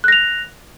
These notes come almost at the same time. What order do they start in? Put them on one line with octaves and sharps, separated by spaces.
F#6 A#6 F7